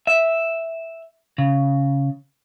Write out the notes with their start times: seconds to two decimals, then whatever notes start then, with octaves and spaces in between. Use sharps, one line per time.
0.07 E5
1.38 C#3